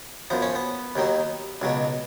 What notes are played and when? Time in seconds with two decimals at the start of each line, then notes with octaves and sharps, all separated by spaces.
0.30 F#2 F3 B3
0.42 C#4
0.55 B3
0.96 D#2 D#3 F#3
1.62 C#2 B2 F#3